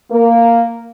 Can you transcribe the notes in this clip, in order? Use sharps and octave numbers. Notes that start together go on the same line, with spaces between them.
A#3